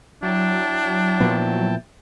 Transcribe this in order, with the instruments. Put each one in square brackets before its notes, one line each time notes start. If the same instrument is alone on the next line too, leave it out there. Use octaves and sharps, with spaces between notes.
[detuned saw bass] F#3 [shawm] D4 [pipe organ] E4 G5 A5
[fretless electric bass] A#2 F3 B3